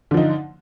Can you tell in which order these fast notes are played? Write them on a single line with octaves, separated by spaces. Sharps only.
D3 F3 D#4